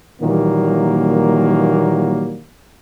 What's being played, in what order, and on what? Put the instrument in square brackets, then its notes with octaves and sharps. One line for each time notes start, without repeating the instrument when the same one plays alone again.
[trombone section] A#2 D#3 E3 F#3 G3 A#3